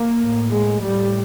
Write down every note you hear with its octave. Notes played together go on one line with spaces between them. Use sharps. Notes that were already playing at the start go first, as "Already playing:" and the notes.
Already playing: A#3
A2
G#3
A2 G3